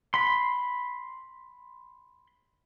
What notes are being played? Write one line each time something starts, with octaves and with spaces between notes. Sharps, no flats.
B5 C6